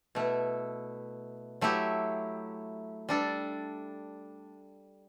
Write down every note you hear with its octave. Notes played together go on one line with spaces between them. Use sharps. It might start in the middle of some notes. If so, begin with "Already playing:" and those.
B2 A3 E4
F#3 A3 E4 G4
G3 D4 A4